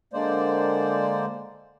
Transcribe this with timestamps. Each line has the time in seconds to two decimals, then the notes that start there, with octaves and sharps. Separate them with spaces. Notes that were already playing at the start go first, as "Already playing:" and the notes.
0.13 D3 G#3 A#3 C5 D5